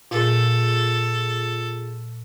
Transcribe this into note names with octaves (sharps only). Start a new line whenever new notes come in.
A#2 F4 G#4 A4